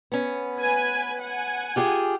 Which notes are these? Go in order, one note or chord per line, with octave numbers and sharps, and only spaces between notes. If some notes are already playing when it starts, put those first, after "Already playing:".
B3 C#4
B4 G#5
F#5 G#5
F4 G4 G#4